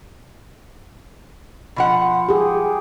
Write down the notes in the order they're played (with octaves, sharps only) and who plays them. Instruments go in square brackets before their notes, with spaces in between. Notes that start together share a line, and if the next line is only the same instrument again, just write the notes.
[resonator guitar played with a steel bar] B2 F3 F#5
[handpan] G4 G#4